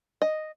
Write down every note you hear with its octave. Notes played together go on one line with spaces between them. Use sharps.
D#5